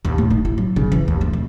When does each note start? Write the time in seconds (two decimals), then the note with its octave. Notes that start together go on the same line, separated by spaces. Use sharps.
0.05 D#2
0.18 A2
0.31 D#4
0.45 E4
0.58 F#3
0.76 C#3
0.92 E3
1.08 D#2
1.21 A3
1.33 F2